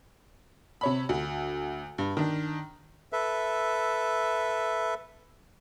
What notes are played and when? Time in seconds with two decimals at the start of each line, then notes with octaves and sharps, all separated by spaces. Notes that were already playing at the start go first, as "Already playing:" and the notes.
0.81 C3 C#5 B5
1.09 D2
1.98 G2
2.17 D#3 D4
3.13 A4 B4 E5